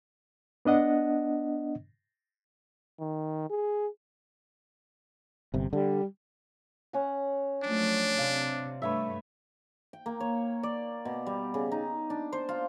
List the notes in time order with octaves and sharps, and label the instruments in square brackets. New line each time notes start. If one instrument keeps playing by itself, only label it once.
[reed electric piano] B3 D4 D#5 F#5
[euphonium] D#3
G#4
[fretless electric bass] G1 C3
[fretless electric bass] D3 [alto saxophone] G3
[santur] C#4 F#5
[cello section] F3 F#3 A3 [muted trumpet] D4
[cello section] C3 [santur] D5 F5
[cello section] G2 A3 [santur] B4 C#5 E5
[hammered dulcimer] G5
A#3
C#5
D5
B2
G3
C#3
D#4
D4
C5
F4